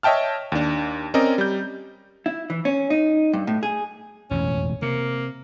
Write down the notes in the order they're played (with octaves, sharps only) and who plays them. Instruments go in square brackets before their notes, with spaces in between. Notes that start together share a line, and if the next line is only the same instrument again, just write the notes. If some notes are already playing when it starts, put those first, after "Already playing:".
[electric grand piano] C#5 D#5 E5 G5 A5 F6
D#2 D4
C4 C#4 A#4 D5 D#5
G3 G6
[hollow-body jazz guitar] E4
E3
C#4
D#4
G2
A2
G#4
[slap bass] E1 A1 F2 [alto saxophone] C#4
[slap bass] C3 [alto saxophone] A#3